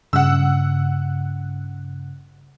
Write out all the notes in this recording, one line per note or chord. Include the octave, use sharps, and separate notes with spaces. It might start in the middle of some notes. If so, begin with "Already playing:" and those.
G2 C#3 F#5 E6